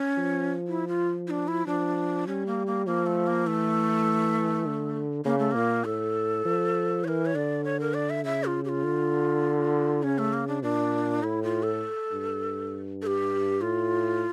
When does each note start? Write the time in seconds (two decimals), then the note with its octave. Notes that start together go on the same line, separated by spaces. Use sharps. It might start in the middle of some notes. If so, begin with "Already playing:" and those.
Already playing: C#4
0.18 F3
0.67 E4
0.88 F4
1.27 E4
1.30 D4
1.48 E4
1.67 F3 D4
2.27 G3 C#4
2.46 A#3
2.67 A#3
2.86 F3 A#3
3.06 A3
3.27 A#3
3.47 E3 A3
4.66 D3
5.25 C#3 A#3
5.39 A3
5.52 A#2 A#3
5.85 A2 A4
6.45 F3
7.04 E3 A#4 C#5
7.26 C#5
7.35 D3 D5
7.64 C#5
7.80 A#4
7.94 D5
8.10 E5
8.25 C#3 E5
8.45 F4
8.65 G4
8.69 F4
8.84 D3
10.03 C#3 C#4
10.18 A3
10.33 A#3
10.48 D4
10.63 A#2 D4
11.22 A2 E4
11.43 F4
11.63 A4
12.12 G2
13.02 A4
13.07 G4
13.61 A2 F4